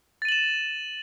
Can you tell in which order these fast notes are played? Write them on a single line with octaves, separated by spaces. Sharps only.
A6 D#7 F#7 E7